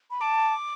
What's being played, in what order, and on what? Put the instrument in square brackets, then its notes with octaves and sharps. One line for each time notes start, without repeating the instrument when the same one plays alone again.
[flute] B5
[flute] A5 [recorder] D6